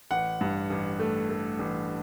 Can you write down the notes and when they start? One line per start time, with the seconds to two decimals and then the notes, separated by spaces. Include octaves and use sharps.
0.11 A1 F#5
0.41 G2
0.70 A1
0.99 A3
1.29 A3
1.59 A1